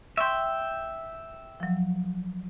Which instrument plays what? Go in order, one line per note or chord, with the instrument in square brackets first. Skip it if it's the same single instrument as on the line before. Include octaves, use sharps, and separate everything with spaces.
[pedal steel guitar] E5 G5 [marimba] C6 C#6
[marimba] F3 F#3